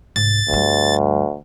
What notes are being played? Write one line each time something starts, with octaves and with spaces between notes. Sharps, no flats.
C2 G#2 A6
D2 G2 G3